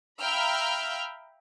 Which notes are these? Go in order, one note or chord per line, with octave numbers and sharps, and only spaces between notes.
E5 F5 G5 A#5 B5 F6